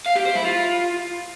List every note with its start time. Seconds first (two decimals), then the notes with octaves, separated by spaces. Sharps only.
0.06 F5
0.15 G4
0.25 C5
0.35 E4
0.45 F4